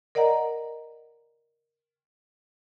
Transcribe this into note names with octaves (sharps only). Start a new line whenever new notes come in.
A#4 D5 D#5 F#5 A#5